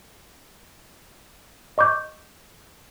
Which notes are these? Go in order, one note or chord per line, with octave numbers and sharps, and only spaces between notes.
D#5 C#6 D6 G6